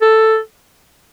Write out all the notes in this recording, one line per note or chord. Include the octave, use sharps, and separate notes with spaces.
A4